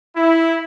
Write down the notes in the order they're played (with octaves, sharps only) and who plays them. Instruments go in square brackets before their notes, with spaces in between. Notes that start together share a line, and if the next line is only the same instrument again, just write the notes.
[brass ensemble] E4